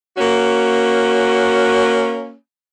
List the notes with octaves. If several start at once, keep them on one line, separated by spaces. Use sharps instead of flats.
A#3 C#4 F#4